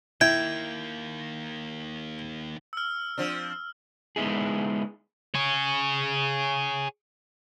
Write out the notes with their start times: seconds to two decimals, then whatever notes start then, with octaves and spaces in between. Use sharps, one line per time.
0.21 D#3 A#3 E4 G5 G#6
2.73 E6 F6
3.18 F3 C4 D4
4.16 G#3 B3 D#4 E4 G#4
5.34 G#4 C#5